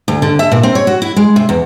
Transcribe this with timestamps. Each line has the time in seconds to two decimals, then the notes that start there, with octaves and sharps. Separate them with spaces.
0.08 D2
0.22 D3
0.39 E5
0.51 A#2
0.63 C4
0.75 C#5
0.87 F#4
1.02 E4
1.16 G#3
1.36 C3
1.49 E2